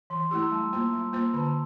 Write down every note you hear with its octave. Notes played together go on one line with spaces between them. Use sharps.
E3 C6
C6
A3 E4 G4 E6
A#5
G3 A5
A#3 F4 C5
G3
A#3 F4 C5
D3 A5
A#5